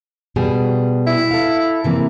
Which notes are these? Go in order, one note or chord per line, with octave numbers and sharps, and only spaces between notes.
B2 G3 G#4
E4
A4 F5
C3 E3 A#3